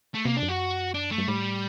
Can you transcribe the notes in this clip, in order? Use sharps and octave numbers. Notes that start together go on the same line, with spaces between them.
A3
C3 A#3
D4
F#2
F#4
D4
A3
G2
A2 G3